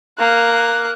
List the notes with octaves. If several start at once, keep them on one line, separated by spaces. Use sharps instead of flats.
A#3 F#6